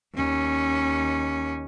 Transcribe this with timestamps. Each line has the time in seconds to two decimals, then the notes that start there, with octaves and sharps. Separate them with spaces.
0.15 D#2 C#4